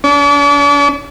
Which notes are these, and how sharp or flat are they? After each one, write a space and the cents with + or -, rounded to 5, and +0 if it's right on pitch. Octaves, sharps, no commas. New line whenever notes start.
D4 -40